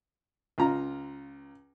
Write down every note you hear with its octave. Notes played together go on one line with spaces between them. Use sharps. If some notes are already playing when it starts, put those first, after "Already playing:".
C#2 F4 A#5